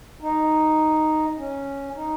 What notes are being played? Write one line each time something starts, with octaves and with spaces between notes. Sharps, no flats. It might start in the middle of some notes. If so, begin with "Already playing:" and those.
D#4
C#4
D#4